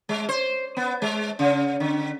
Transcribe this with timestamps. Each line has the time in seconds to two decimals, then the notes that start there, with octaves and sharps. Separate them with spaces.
0.09 G#3
0.29 C5
0.77 B3
1.02 G#3
1.39 C#3
1.80 D3